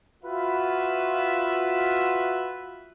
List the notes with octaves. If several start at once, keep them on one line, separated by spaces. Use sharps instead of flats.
F4 F#4 B4 E5